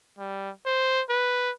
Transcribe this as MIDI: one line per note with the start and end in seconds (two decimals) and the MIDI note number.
0.18 0.50 55
0.66 1.02 72
1.09 1.50 71